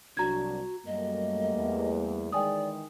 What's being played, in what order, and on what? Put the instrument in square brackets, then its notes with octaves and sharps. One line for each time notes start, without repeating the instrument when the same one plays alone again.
[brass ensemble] C2 F#3 D4 [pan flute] F#4 [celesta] A#5 G#6
[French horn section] F#2 [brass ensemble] G3 A3 A#3 [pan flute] D#5
[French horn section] E2
[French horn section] D#3 E3 G#3 [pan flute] D5 [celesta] G5 G#5 D#6